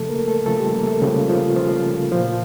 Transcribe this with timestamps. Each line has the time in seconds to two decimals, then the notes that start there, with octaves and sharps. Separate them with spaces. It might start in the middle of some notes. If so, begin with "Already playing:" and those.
Already playing: C#3 F3 A3 A4
0.09 A#3 A#4
0.28 A3 A4
0.46 C#3 F3 A3 A4
0.59 G3 G4
0.73 A#3 A#4
0.87 A3 A4
1.01 C#3 F3 G3 G4
1.28 F3 F4
1.56 C#3 F3 F4
2.12 A#2 F3